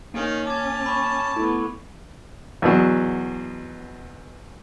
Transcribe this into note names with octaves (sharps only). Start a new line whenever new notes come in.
D#3 A#3 C#4
A5 D6 G#6
B5 C#6
A3 B3 E4
E2 B2 F#3